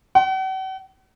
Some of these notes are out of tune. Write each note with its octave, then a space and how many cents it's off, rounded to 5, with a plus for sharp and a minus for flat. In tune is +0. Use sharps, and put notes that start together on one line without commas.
F#5 +45